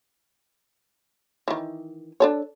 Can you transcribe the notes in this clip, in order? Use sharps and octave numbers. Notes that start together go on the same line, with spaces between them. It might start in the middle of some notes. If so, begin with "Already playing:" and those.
D#3 E3
D4 A4 C#5